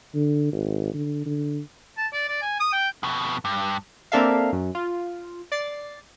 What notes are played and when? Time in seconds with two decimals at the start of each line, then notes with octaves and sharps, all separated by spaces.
0.14 D3
0.52 G#1
0.94 D3
1.26 D3
1.97 A5
2.13 D5
2.28 D5
2.42 G#5
2.60 D#6
2.73 G5
3.03 F2 B2
3.45 G2
4.12 A#3 C4 D4 A4 E5 F5
4.53 F#2
4.75 F4
5.52 D5 A6 C7